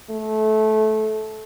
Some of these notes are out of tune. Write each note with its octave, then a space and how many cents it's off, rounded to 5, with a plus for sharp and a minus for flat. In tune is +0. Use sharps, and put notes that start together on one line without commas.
A3 -20